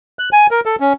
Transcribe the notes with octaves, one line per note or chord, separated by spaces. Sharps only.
F#6
G#5
A#4
A4
C#4